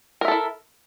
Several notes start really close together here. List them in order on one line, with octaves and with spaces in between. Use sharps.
A#4 E5 A4 E4